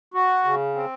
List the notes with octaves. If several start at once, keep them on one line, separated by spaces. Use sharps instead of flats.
F#4
C#3
C4